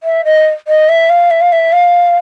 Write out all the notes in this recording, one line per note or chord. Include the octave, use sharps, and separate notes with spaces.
E5
D#5
D#5
E5
F5
E5
F5
E5
F5